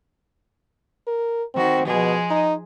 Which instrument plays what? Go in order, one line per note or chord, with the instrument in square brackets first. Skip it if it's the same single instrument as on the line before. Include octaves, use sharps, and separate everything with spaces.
[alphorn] A#4
[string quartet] D#3 F#4 [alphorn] C4
[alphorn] B2 [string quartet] F3 G#3 G#4
[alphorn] D#4